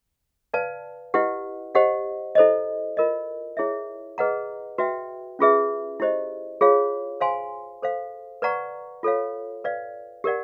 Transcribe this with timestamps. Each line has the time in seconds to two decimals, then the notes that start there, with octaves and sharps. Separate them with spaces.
0.54 B4 D5 F5 A5
1.14 E4 G4 B4 D#5 F#5
1.75 G4 C5 D#5 F#5
2.35 E4 A4 C5 D#5
2.97 F4 A#4 D#5
3.57 E4 G#4 C#5 E5
4.18 G#4 B4 D#5 F#5 A#5
4.78 F#4 B4 E5 G5
5.39 C#4 F4 G#4 B4 E5
6.00 E4 G4 C5 D#5
6.61 F4 G#4 C#5 F5
7.21 C5 F5 G#5 C6
7.82 A4 C5 F5
8.42 B4 D5 F#5 A#5 C#6
9.03 F4 A4 C#5 F5
9.64 B4 D5 F5
10.24 G4 A#4 D5 F#5